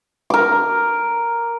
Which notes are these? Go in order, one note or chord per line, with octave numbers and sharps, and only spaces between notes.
A#4 D6